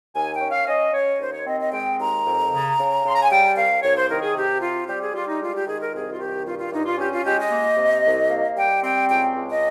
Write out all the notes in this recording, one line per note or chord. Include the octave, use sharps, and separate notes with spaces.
D#2 G#5
G5
C#4
F5
C#4 D#5
C#4 C#5
D#2 C5
C#5
C4 D#5
D#5
G#3 G5
D#2 A#5
F2
C#3
C#3
C#3 C6
A#5
G#5
G3 G5
C2 F5
C2 C#5
C5
D#3 A#4
G#4
C3 G4
C4 F4
G3 G4
G#4
G3 F4
D#4
G#3 F4
G4
D#3 G#4
A#4
C2 G#4
F4
D#3 G4
G2 F4
F4
G2 D#4
F4
C#4 G4
F4
G#3 G4
D#5
A#3
C3
C2
A#3
G3 G5
C4 G5
C#2 G5
C#2
D#5